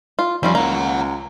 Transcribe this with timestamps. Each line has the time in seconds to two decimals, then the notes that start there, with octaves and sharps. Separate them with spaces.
0.19 F4
0.43 F2 G3 C#4 F4
0.55 C#2 A#3 F#5 A#5